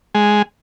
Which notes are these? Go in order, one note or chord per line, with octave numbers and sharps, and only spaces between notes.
G#3